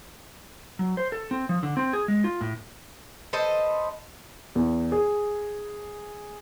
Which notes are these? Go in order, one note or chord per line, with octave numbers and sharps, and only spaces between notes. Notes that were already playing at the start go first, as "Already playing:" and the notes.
F#3
C5
A4
C4
F3
D3
C4
G#4
G#3
F4
A2
A4 B4 C5 D#5
E2
G#4